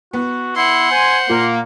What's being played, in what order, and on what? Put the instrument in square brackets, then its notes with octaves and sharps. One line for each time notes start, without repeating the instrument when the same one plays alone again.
[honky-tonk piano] B3 [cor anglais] F#4
[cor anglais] E4 [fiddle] F#5 C6
[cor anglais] C5 [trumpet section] G#5
[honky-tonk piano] A#2 [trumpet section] A#3